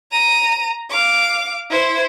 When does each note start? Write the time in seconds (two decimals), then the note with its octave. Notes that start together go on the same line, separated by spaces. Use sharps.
0.11 A#5 D#7
0.90 F5 D6
1.70 E4 C5